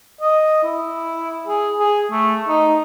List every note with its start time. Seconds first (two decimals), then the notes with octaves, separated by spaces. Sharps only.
0.21 D#5
0.64 E4
1.47 G#4
1.79 G#4
2.12 A3
2.48 D#4